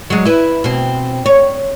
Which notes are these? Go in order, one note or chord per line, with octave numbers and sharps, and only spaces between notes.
F#3 G#3
E4 B4
B2 C4
C#5